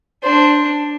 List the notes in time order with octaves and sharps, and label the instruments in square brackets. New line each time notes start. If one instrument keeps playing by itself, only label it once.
[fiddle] D4 [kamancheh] C5